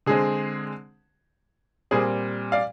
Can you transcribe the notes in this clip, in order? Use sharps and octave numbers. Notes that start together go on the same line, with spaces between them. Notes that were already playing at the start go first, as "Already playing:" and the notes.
D3 G#3 C4 G#4
A#2 G3 C4 G#4
D5 F5